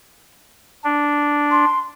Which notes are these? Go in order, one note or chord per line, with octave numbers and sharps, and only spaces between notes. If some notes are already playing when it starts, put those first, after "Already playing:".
D4
C6